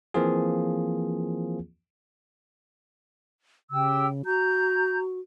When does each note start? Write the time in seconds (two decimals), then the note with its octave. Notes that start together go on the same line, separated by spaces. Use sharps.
0.14 E3 F3 A#3 C4 F4 G#4
3.71 C#3 G4 G5 E6
4.25 F#4 A#5 G6